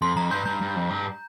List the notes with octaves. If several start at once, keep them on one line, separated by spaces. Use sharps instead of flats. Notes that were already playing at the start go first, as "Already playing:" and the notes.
F2 C6
F2 A#5
G2 G6
G2 G6
G2
F2
G2